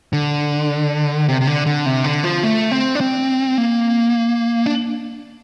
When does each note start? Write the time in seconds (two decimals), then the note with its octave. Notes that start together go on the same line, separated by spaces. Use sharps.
0.13 D3
1.29 C3
1.41 C3
1.47 D3
1.66 D3
1.86 C3
2.04 D3
2.24 F3
2.43 A3
2.71 C4
2.95 D4
3.01 C4
3.58 A#3
4.66 D4